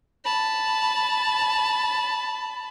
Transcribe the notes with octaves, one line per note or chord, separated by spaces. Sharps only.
A5 B5